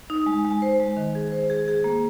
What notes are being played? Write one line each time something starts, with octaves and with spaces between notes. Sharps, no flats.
D#4
G#3
G#3
C5
G#3
D#3
G#4
C5
G#4
G#4
A#3